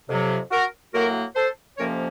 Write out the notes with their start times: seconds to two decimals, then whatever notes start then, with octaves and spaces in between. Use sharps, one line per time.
0.09 F2 C3 F#3
0.51 F#4 A#4
0.93 A2 F#3 A#3 F#4 A#4
1.36 A4 C5
1.78 F2 C3 F3 A#3 C#4 A#4 C#5